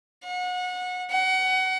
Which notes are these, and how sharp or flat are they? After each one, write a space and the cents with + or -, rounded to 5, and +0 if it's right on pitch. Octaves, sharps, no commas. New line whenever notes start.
F#5 -30
F#5 +25